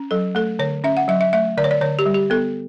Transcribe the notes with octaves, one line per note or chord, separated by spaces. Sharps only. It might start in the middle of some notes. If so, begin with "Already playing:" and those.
Already playing: C#4
F#3 A4
A3 A4
D3 C#5
C#4 E5
F#5
F#3 E5
E5
A3 E5
D3 D5
C#5
D5
D3 C#5
G4
G3
G4
B3 A4